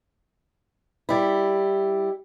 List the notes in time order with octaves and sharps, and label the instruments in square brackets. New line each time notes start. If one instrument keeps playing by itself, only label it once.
[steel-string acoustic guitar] G3 E4